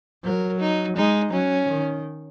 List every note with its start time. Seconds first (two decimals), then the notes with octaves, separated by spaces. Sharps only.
0.24 F#3 A#4
0.60 D#4
0.96 G#3 D#4
1.32 F#3 C#4
1.69 D#3